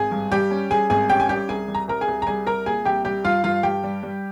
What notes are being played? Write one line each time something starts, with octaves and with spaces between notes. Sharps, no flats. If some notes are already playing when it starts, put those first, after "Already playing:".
Already playing: G#1 G#4 G#5
G2
G3 G4 G5
C#4
G3 G#4 G#5
G#1 G#4 G#5
C#4 G4 G5
G#5
G3 G4 G5
C2 G#4 G#5
G3
A#5
C2 A#4 A#5
G#4 G#5
C2
A#5
G3 G#4 G#5
C2 A#4 A#5
A#2 G#4 G#5
C2 G4 G5
G3 G4 G5
G2 F4 F5
G2 F4 F5
G2 G4 G5
G3
G3